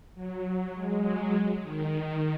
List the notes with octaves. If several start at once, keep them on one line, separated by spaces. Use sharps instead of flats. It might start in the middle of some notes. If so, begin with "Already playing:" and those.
F#3
G#3
F#3
D#3
D#3